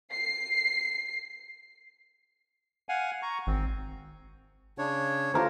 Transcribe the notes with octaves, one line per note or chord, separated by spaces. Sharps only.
C7
F5 F#5 G#5
A#5 C#6
G#1 C4
C#3 D4 C#5
D3 F4 G4 A#4 C5